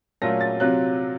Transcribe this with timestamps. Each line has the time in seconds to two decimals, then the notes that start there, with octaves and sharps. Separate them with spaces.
0.22 A#2 F#3 A3 C#4 F4 A#6
0.41 A6
0.60 C3 F#3 C4 F4 F#6